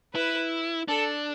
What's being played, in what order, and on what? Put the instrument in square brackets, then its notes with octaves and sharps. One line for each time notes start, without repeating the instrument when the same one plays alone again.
[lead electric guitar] E4 [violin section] B4
[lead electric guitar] D4 [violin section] A4